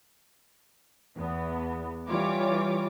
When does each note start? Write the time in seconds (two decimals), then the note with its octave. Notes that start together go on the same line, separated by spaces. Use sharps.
1.17 E2 B3
2.08 E3 G3 F4 C#5 D6